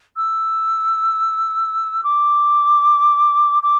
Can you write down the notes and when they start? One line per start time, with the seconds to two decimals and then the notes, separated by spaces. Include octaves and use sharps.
0.16 E6
2.03 D6
3.62 D6